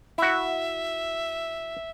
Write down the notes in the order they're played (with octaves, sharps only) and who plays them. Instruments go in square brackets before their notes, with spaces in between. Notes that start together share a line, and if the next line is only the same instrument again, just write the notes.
[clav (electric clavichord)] E4 F#4 [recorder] E5